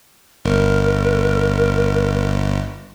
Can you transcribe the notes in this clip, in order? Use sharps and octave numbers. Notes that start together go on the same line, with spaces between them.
G1 A#4